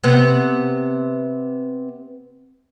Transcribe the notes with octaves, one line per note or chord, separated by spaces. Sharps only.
C3 B3